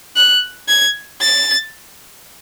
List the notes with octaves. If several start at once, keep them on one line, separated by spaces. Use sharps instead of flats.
F#6
G#6
A6